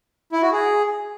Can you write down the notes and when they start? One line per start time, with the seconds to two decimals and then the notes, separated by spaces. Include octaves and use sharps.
0.32 E4
0.42 F#4
0.52 G#4